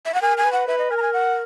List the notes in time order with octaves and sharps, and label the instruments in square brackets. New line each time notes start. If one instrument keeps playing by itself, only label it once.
[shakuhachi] E5
F#5
[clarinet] A#4 [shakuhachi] G#5
[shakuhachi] G#5
[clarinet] B4
[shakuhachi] F#5
[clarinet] B4 [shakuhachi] E5
[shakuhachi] D#5
[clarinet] A#4 [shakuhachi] G#5
[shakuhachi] A#5
G#5
F#5